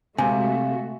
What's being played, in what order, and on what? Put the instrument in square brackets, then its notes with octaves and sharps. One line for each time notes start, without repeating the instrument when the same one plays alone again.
[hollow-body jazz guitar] C3 [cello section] G#3 A3 F#4 [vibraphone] C4 F5 [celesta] G#5